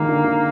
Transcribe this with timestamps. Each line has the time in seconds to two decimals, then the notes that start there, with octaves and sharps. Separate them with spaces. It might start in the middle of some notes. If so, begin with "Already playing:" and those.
Already playing: D#3 G#3 A#3
0.08 D3
0.24 D3